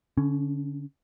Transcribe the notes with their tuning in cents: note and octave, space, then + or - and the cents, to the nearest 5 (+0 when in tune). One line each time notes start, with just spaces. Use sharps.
D3 -30 C#4 +0